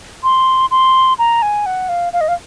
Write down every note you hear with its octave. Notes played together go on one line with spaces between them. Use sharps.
C6
C6
A#5
G#5
F#5
F5
F5
D#5
F5